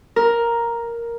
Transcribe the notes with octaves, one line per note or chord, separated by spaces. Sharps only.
A#4